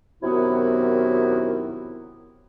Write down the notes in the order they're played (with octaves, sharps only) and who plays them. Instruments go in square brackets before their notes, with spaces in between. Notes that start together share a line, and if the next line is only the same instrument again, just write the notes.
[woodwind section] F#2 C3 D#3 B3 E4 F#4